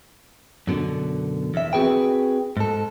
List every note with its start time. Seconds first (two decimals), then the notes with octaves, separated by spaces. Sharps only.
0.67 F#2 B2 D3
1.54 E2 E5
1.73 C4 F#4 G#4 B4 G5
2.57 G#2 A4